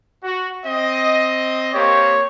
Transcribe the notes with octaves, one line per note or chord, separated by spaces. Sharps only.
F#4
C4 D#5
A#3 C4 G4 C#5